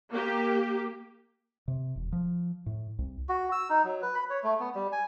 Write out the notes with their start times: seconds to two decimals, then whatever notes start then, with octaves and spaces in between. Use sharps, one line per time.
0.10 A#3 G4
1.68 C3
1.96 E1
2.12 F3
2.66 A2
2.99 C2
3.29 F#4
3.52 E6
3.70 D#4
3.84 F#3
4.02 B4
4.15 B5
4.30 C#5
4.43 A3
4.60 B3
4.75 G3
4.92 G#5